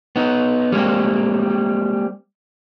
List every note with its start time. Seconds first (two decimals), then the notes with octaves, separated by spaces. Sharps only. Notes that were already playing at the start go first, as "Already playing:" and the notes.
0.16 B3 D#4
0.72 G3 G#3 A#3 C4